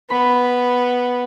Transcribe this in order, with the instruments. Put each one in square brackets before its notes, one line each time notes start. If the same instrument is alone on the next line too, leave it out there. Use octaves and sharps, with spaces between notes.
[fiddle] B3 [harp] B5